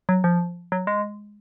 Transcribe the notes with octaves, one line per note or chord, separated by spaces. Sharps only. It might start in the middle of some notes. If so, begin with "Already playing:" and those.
F#3
F3
F#3
G#3